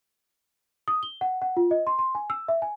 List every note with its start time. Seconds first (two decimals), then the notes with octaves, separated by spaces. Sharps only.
0.88 D#6
1.03 G7
1.21 F#5
1.42 F#5
1.57 F4
1.71 D#5
1.87 C6
1.99 C6
2.15 G#5
2.30 E6
2.48 E5
2.62 G#5